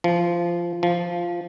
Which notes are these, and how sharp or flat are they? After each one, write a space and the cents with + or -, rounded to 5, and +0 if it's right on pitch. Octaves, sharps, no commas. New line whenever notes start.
F3 -15
F3 -5